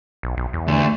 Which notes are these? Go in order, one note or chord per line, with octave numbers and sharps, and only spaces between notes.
B1
B1
E2
D2